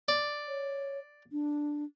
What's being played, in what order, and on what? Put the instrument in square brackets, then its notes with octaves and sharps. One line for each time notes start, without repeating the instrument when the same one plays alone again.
[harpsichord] D5
[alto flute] C#5
D4